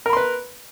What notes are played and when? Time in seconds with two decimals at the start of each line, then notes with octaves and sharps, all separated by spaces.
0.06 A#4
0.09 B5
0.13 C6
0.17 B4